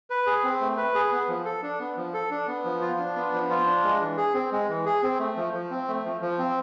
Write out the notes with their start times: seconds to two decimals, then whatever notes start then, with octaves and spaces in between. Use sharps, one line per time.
0.10 B4
0.26 G#4
0.44 C4
0.60 A3
0.77 B4
0.95 G#4
1.12 B3
1.28 F3
1.45 A4
1.63 D4
1.80 B3
1.97 F3
2.14 A4
2.31 D4
2.47 B3
2.65 F3
2.81 F4
2.99 D4
3.16 B3
3.33 F3
3.50 F4
3.66 D4
3.83 G#3
4.00 E3
4.17 G#4
4.34 C4
4.52 G#3
4.69 E3
4.86 G#4
5.03 C4
5.19 A3
5.37 F3
5.53 F3
5.71 C4
5.88 A3
6.05 F3
6.21 F3
6.39 C4